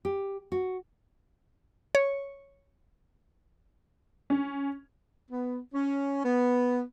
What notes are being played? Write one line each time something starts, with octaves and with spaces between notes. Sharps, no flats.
G4
F#4
C#5
C#4
B3
C#4
B3